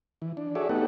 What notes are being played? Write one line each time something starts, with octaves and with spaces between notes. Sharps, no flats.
E3
D4
F#4 G#4 A4 C#5 D5 E5
A3 B3 D#4 G4 A4 F#5